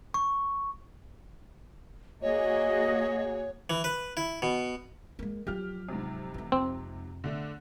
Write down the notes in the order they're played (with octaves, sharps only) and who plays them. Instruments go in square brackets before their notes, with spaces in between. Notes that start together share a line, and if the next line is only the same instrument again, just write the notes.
[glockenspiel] C#6
[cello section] A#3 F#4 G#4 [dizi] C#5 [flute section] D#5
[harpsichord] E3
B4
E4
B2
[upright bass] G#3 A#3
[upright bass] F3 F#3 [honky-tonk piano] G4 F6
[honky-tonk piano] G#2 C3
[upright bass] E3 A3
[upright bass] F2 [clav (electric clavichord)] C4
[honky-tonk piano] D3 A3 D4